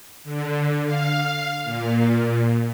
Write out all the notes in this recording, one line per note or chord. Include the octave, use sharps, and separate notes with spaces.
D3
F5
A#2